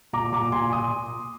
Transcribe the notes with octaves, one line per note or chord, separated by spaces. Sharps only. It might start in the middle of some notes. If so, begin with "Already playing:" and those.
A#2 A#5 D6
A#2 A#5 D6
A#2 G#5 C6
A#2 C6 D#6